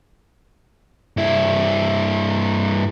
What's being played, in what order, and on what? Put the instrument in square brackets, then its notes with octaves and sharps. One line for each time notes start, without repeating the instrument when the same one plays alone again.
[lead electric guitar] G2 E4